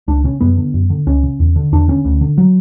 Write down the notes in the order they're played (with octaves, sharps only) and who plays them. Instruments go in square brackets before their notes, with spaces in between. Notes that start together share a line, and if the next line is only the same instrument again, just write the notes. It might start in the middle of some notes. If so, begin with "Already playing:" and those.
[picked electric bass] C#2 D4
C#3 C#4
F#2 B3
D3
F#2
D3
C#2 C#4
C#3
E2
D3
E2 D4
D3 C#4
D2
D3
F#3